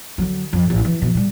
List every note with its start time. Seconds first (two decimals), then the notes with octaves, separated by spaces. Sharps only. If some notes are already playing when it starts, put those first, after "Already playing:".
0.18 D3 F#3
0.53 F2
0.70 A1
0.85 E3
1.02 B2 F3
1.14 B2 G3